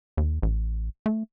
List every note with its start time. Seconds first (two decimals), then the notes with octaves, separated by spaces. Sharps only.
0.17 D#2
0.42 A1
1.06 A3